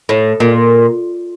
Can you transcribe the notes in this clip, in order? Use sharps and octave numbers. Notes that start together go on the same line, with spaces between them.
A2
A#2